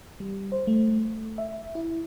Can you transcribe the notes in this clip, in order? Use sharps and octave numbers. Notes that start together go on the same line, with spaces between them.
G3
C5
A3
E5
E4